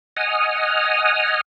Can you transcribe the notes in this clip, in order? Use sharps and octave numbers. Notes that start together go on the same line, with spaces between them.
D#5 F#5 G#5 D#6 F6